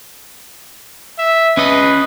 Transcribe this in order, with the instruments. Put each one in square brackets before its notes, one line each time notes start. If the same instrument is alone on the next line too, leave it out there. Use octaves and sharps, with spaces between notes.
[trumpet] E5
[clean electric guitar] C#4 D#5 [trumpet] B4